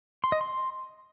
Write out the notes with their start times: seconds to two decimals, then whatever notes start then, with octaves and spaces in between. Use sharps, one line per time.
0.24 C6
0.32 D#5
0.41 C6